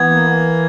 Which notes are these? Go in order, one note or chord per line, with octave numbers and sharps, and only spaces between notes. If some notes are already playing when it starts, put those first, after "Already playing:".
Already playing: E3 B3 G#6
A#3